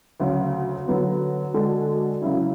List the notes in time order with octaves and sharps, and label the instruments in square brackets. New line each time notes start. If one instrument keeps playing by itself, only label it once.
[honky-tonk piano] D2 C#3 F#3
D3 F#3 B3
D3 G#3 D4 F#4 A4
C#3 F#3 C#4 E4